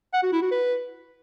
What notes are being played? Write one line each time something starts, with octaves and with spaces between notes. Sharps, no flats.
F#5
F#4
E4
F#4
B4